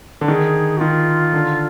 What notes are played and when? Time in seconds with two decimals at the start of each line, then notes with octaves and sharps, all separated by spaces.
0.21 D3
0.28 D#3 G#4
0.77 F#4
0.80 D#3 F4
1.33 D3